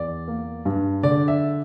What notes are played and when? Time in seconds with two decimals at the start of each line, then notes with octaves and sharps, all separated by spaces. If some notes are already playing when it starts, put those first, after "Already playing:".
Already playing: E2 D5
0.28 A#3
0.65 G2
1.03 D3 D5
1.28 E5